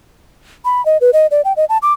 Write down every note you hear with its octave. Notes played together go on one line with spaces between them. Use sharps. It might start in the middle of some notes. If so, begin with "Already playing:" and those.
B5
D#5
B4
D#5
D5
G5
D#5
A5
D6